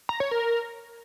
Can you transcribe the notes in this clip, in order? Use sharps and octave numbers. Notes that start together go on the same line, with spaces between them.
A#5
C#5
A#4